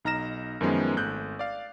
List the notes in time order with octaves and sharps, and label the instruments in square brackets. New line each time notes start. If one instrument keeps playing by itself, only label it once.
[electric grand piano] B1 D#4 A#5 F6 A#6 E7
F#2 D#3 F3 G#3 B3 C#4
G#1 A3 F#6 G6
D5 F5